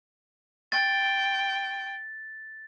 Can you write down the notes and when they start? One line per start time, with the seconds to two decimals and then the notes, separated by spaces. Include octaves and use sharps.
0.72 G5 A6